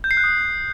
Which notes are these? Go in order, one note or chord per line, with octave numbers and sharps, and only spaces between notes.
G6
C7
F#6
D#6